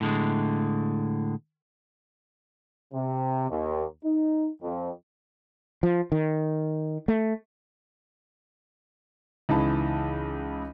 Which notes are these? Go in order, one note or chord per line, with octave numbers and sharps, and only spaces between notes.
A2 D3 G#3
C3
D#2
D#4
F2
F3
D#3
A3
C#2 E3 D#4 A5 B5